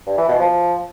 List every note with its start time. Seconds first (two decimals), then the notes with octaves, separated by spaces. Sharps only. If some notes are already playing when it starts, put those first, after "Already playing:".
0.07 G2
0.18 E3
0.29 B2
0.40 F3